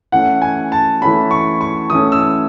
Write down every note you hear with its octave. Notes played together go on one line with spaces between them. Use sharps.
E3 A3 C#4 F#5
G#5
A5
E3 A3 C#4 B5
C#6
C#6
E3 A3 C#4 D#6
E6